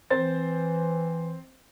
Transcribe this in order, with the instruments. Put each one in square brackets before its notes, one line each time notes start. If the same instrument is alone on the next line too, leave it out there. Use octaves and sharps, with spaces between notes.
[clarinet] E3 [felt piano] C4 C5 A6